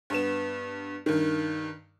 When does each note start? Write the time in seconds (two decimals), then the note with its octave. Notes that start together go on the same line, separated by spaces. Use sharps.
0.10 G2 B3 E7
1.06 G2 D#3